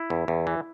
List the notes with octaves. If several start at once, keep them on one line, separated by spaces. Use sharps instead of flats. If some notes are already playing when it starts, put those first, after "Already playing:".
Already playing: E4
E2
E2
E3